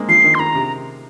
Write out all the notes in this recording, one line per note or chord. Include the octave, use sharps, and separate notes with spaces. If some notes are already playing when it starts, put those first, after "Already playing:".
Already playing: G#3 A#3 C4
F3 C7
D#3
C6
D#3 A#5
C3